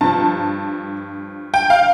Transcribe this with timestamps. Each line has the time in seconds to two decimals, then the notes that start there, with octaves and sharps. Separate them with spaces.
0.01 G2 F3 A5
1.54 G5
1.70 F5